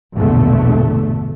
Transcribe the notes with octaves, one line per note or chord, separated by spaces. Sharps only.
A#1 E2 G2 B2 D3 A3